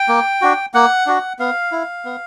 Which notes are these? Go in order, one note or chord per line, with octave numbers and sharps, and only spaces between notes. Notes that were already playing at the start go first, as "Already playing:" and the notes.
Already playing: G5
A#3
D4 F#4
A#3 F#5
D4 F#4
B3 F5
E4
B3